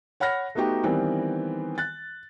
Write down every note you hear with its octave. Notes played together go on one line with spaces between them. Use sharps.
C#5 F#5 B5 F6 A#6
A3 B3 D#4 F#4 G4
D#3 E3 G3 B3 C4
F#6 A6